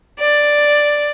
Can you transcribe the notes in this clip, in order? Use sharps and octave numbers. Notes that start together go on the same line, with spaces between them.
D5